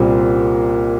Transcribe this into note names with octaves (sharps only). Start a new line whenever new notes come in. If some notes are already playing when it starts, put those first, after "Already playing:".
Already playing: C2 A#2 G3 C4